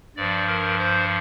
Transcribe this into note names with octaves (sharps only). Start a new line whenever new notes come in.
G2 F3 D5
A#4
C5